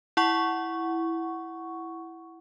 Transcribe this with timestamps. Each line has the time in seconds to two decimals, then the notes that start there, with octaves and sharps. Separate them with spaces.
0.17 E4 F#5 C#6